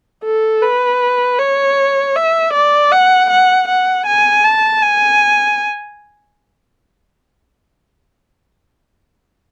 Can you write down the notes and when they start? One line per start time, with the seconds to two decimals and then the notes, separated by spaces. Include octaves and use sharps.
0.24 A4
0.62 B4
1.39 C#5
2.15 E5
2.54 D5
2.92 F#5
3.30 F#5
3.68 F#5
4.06 G#5
4.44 A5
4.82 G#5